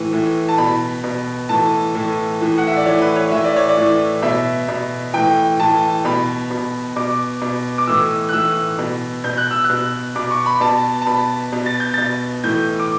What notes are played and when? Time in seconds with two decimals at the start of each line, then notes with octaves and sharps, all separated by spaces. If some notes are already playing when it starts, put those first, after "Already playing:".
Already playing: A2 E3
0.13 A2 E3
0.49 A5
0.58 B2 B5
1.04 B2
1.49 A2 E3 A5
1.95 A2 E3
2.41 A2 E3
2.58 F#5
2.67 E5
2.77 D5
2.86 A2 E3 C#5
3.01 B4
3.16 C#5
3.31 A2 E3 E5
3.44 D5
3.56 C#5
3.69 D5
3.77 A2 E3
4.22 B2 E5
4.68 B2
5.14 A2 E3 G5
5.60 A2 E3 A5
6.05 B2 B5
6.51 B2
6.96 B2 D6
7.42 B2
7.78 D6
7.87 A2 E3 E6
8.29 F#6
8.33 A2 E3 E6
8.79 B2
9.24 B2 G6
9.37 F#6
9.51 E6
9.64 F#6
9.70 B2
10.16 B2 D6
10.31 C#6
10.46 B5
10.61 B2 A5
11.01 A5
11.06 B2 B5
11.53 B2
11.66 A6
11.80 G6
11.94 B2 A6
12.44 A2 E3 G6
12.80 D6